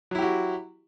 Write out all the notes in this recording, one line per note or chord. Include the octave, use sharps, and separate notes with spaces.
F#3 E4 F#4 G4